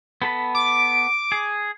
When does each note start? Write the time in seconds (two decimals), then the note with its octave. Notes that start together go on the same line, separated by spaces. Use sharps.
0.22 B3 A4 B5
0.55 D6
1.32 G#4